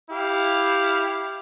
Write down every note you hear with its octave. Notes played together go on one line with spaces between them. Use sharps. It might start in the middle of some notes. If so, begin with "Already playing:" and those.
E4 G4 F5